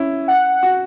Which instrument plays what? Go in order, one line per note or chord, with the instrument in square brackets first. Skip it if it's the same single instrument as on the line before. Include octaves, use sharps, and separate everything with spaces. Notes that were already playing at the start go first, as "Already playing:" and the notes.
Already playing: [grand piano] C#4 E4
[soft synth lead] F#5
[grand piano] F#4